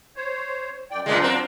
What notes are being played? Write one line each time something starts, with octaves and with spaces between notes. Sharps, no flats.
C5 C#5
F#2 D5 G5
F#2 A#2 F#3 G#3 D4 F4
C4 A#4